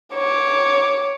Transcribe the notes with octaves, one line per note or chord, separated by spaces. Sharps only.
C#5 D6